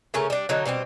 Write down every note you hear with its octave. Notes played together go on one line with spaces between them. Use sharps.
C#3 A3 C#4 A#4
G3 D4
D3 F#3 D#4
B2 G3 B3 C4